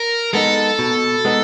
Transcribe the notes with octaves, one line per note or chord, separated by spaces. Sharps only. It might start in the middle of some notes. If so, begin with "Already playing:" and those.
Already playing: A#4
G#3 B3 D#4 A4
B2
G#3 B3 D#4